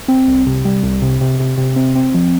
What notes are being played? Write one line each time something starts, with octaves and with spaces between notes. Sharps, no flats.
C4
C2
C3
G3
C2
C3
C3
C3
C3
C4
C4
F3